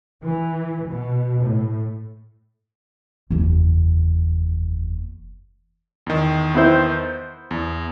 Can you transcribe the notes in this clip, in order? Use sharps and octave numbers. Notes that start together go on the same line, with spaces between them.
E3
B2
A2
F#1 E2
E2 D#3
B3 E4 C5
E2